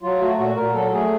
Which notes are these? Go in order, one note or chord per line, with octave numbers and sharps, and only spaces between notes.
F#3 F4
A3 F#4
A#2 F#4
A#2 A#4
F#3 A4
A3 G#4